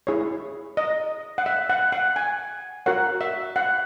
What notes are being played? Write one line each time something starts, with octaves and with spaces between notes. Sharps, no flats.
E4 G#4 C#5
D#5
F#5
E5
F#5
F#5
G#5
F#4 A#4 C#5 F#5
E5
F#5